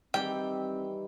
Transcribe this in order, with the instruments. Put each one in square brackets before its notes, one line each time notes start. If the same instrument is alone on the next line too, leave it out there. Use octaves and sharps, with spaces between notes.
[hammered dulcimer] D#3 E3 [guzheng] G3 G4 [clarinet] C4 [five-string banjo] G5